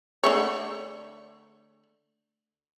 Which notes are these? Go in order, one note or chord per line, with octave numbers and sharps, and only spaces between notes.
D3 A3 C#5